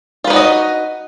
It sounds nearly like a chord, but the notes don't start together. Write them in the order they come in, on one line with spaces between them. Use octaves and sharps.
F4 B4 D#4 F#4 D#5